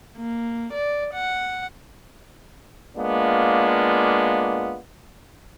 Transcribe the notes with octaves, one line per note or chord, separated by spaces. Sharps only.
A#3
D5
F#5
G#3 A#3 B3 D4 F4